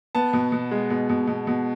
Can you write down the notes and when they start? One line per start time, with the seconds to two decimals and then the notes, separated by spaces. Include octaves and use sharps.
0.15 B3 A5
0.33 B2
0.52 B2
0.71 G#3
0.90 B2
1.10 B2
1.28 B2
1.47 B2